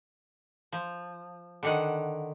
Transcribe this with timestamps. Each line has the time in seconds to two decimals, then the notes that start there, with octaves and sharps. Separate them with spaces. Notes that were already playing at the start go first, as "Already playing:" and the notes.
0.72 F3
1.63 D3 D#3 F#5